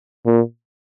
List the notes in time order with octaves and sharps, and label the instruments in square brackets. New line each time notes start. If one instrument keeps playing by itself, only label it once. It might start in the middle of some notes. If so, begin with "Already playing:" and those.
[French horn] A#2